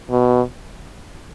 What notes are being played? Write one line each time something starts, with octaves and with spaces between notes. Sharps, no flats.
B2